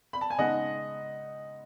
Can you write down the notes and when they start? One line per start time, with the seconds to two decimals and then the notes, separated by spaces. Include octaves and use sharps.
0.13 B5
0.21 A5
0.30 G#5
0.38 C#3 G#3 B3 D#4 D#5 F#5